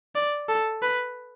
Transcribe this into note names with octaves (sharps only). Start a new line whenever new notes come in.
D5
A4
B4